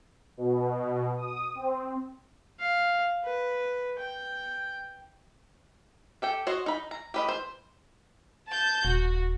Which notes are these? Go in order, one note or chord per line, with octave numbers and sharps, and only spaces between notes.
B2
D#6
C4
F5
B4
G5
G4 A4 G5
F#4 C5 C#5 D#5
D#4 B5
A#5
G4 B4 D#5
C5
A5 G6
D#1 F#4